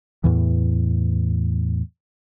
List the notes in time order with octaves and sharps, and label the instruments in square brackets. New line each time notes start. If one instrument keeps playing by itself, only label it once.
[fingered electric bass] E2 A2 E3